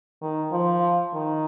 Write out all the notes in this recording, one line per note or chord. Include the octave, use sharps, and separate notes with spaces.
D#3
F3
D#3